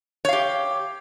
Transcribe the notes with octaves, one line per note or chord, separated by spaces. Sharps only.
G4 C#5 F5